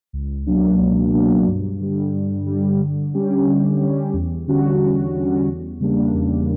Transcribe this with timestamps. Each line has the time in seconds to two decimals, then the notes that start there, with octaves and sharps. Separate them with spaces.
0.13 C#2
0.46 B2 F#3 A#3 D4
0.80 C#2
1.13 B2 F#3 A#3 D4
1.47 G2
1.80 D3 G3
2.14 G2
2.46 D3 G3
2.80 D3
3.14 G3 C#4 G4
3.47 D3
3.81 G3 C#4 G4
4.13 E2
4.47 D3 G3 C#4 F#4
4.81 E2
5.14 D3 G3 C#4 F#4
5.47 E2
5.80 C#3 G3 A#3 D4
6.14 E2